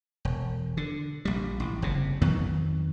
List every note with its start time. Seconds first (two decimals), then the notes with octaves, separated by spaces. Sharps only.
0.25 E1
0.77 D3
1.25 A#1 G3
1.60 A1
1.82 F#1 C3
2.22 F2 D#3 F#3 B3